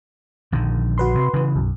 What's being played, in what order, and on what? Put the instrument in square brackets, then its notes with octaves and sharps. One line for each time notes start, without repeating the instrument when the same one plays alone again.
[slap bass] A#1 D3 D#3
[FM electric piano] F#4 B4 C6
[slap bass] C3
C#3 E3
[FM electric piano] B1 F#2